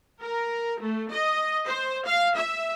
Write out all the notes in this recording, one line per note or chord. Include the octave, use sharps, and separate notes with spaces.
A#4
A3
D#5
C5
F5
E5